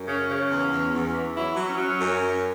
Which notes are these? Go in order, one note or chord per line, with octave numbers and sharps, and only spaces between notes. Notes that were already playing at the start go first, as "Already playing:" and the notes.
Already playing: F#2
C#3 C#4
C#3
E2
E2
E2
E3
F#3 E4
F#3
C#4
F#3
F#2
F#3